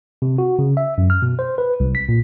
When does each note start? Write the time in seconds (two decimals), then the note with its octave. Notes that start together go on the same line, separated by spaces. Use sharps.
0.22 C3
0.38 F#4
0.59 C#3
0.77 E5
0.98 F#2
1.10 F6
1.22 B2
1.39 C5
1.58 B4
1.80 C2
1.95 B6
2.09 A#2